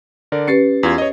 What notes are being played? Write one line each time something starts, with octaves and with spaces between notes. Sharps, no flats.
D3 A#4 D5
C#4 G4 B4 A6 C7 C#7
E2 F4 G#6
C#5 D#5